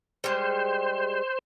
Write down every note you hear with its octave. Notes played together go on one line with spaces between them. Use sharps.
G3 G#3 C5